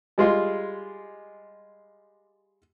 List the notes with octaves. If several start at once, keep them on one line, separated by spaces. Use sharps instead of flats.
G3 G#3 F4